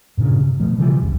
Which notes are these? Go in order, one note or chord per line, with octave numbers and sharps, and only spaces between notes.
G2 A#2 C#3 D4
C3
B2 F3 A3
C#3 E3 F3 G3
E1 C2 G2